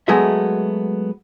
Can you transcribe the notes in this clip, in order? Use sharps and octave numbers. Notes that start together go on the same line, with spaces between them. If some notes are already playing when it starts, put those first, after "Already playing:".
F#3 G#3 A3 B3 F#4 E5